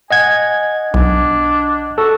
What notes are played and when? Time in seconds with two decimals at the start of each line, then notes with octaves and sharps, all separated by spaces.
0.11 D#5 F#5 G#5 G#6
0.94 B1 D4
1.98 F#4 A4